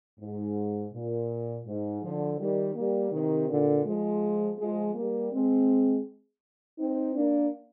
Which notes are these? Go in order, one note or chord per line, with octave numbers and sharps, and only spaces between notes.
G#2
A#2
G#2
D3 F3
D#3 G3
G3 A#3
C3 D#3
A#2 D3
F3 G#3
F3 G#3
G3 A#3
G#3 C4
C4 D#4
A#3 D4